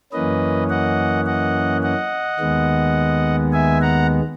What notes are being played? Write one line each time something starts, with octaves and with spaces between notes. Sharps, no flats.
F#2 E3 A#3 C#4 B4 D#5
D#5 F#5
D#5 F#5
D#5 F#5
D#2 D#3 G#3 B3
E5 G#5
F#5 A#5